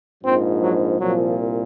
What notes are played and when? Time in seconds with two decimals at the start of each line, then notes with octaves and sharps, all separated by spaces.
0.23 A#1 G#2 F3 C4
0.61 F#3
0.99 C2 A#2 F3 F#3